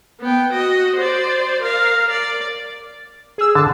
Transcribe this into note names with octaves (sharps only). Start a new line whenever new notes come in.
B3 G5
F#4 D#5
C5 D5
A#4 F5
D5
G#4 E6
D3 A5